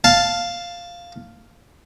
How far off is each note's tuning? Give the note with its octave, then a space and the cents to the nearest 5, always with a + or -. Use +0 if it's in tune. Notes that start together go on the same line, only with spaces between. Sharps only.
F5 +0 A5 +0